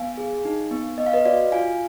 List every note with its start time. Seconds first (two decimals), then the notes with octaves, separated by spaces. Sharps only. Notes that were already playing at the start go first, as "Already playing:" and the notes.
Already playing: B3 F5 G#5
0.17 G#4
0.45 D#4
0.71 B3
0.98 B3 D#5
1.06 F5
1.13 B4 D#5
1.25 F#4 D5 F5
1.52 F4 F5 G#5